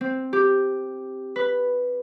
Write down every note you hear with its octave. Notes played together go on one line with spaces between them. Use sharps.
C4
G4
B4